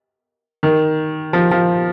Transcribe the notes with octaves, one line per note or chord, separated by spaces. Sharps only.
D#3
F3
F3